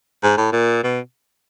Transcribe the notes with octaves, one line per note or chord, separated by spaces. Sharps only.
G#2
A2
A#2
B2